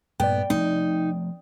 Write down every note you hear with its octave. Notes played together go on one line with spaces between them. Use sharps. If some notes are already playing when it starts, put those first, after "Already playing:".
G2 A#2 B3 D5 G5
F3 A3 C4 D#4